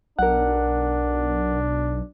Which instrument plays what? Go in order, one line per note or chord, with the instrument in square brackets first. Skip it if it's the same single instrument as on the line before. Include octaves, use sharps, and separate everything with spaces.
[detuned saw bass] B1 [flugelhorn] D4 [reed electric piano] A#4 F#5